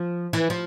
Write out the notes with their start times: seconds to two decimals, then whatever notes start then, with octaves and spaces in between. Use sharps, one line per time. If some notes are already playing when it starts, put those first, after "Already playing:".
Already playing: F3
0.33 E3
0.50 F3